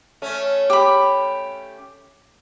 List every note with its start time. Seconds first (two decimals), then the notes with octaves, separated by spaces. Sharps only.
0.22 A3 C#4
0.70 G4 B5